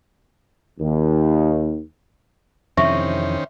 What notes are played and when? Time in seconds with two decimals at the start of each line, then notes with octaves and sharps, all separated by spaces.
0.80 D#2
2.77 F2 C3 D#3 E3 C#4 C5 E5 C#6